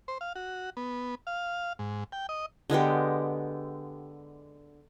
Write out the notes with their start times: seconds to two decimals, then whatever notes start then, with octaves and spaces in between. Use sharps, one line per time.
0.08 C5
0.21 F5
0.36 F#4
0.77 B3
1.27 F5
1.79 G#2
2.12 G5
2.29 D#5
2.70 D3 G#3 B3 G4